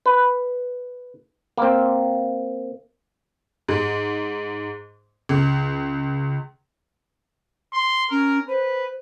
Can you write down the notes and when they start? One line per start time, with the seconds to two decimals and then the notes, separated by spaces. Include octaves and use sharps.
0.06 B4
1.58 A#3 C4
3.68 G#2
5.29 C#2
7.73 C6
8.11 C#4 A#4
8.48 B4 C5